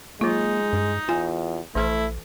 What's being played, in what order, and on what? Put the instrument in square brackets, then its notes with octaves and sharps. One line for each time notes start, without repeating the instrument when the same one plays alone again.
[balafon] F#3 F4 [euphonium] G#3 [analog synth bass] A#3 [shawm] D#4
[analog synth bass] G2
[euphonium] E2 [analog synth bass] F4 [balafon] G#5
[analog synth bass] A#1 [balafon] E3 A4 C5 [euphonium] A3 [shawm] E4